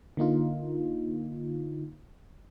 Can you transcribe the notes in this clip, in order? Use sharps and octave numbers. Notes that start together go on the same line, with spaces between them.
D3 A#3 D#4 F4